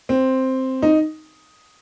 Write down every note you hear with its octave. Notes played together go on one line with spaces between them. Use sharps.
C4
D#4